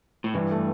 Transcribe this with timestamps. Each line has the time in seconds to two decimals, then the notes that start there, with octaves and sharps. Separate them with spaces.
0.24 A2
0.34 G2 E3
0.51 A3